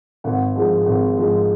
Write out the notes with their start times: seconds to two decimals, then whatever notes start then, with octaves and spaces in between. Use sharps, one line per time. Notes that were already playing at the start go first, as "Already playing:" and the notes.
0.24 G#1 F#5
0.56 G#2 F3 G#3
0.86 G#1
1.17 G#2 F3 G#3